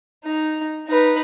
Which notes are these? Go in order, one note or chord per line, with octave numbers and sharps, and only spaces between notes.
D#4
D#4 B4